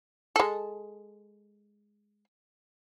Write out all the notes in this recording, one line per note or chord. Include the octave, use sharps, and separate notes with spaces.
G#3 A4